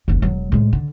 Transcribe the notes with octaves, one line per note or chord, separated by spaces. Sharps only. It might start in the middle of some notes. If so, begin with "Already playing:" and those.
F#1 D#2
E1 F#3
A2 G#3
D3